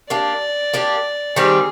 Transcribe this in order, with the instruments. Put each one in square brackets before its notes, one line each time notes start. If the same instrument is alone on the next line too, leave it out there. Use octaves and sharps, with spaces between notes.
[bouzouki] A#3 D4 G4 [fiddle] D5
[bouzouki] A#3 D4 G4
[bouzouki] D#3 G3 C4 G4 [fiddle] G#4